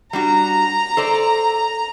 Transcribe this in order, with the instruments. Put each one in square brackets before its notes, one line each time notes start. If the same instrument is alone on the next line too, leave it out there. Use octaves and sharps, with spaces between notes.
[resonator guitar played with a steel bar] G3 D4 F#4 [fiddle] A#5
[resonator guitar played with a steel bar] A4 C5 D5